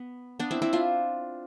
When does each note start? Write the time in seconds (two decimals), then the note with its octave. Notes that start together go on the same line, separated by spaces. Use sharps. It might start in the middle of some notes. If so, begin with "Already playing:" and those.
Already playing: B3
0.39 B3 D4
0.51 C4 E4
0.62 C4 E4
0.73 D4 F4